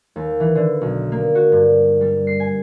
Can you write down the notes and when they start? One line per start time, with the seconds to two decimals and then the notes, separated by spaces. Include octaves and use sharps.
0.16 D#2
0.40 E3
0.55 D3
0.81 B1
1.12 A#3
1.35 F#4
1.52 G2
2.01 G3
2.27 C7
2.40 G#5